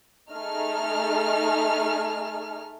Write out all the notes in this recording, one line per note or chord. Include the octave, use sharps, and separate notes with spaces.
A3 D#4 G#4 F6